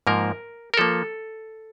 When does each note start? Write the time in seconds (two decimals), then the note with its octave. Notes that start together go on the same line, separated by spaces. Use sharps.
0.07 G#2 F3 A#3 A#4
0.74 A#4
0.77 F3 A#3 A4